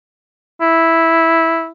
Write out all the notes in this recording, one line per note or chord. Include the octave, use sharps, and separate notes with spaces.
E4